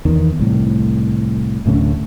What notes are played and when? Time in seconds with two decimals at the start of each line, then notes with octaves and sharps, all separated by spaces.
0.05 E2 D#3
0.39 C2 A2
1.66 D1 A2 D3 C#4